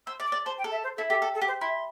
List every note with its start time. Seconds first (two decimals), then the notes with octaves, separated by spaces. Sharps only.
0.07 C5 E6
0.20 D5
0.26 D6
0.32 D5
0.45 C5 A5
0.58 G5
0.64 A4
0.71 E5
0.84 C5
0.97 E4 A4
1.10 G4 A4
1.22 A4
1.35 A4
1.42 G4
1.48 C5
1.61 E4 C6